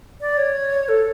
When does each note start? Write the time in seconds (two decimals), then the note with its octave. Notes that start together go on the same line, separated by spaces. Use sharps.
0.21 D5
0.37 C#5
0.88 A4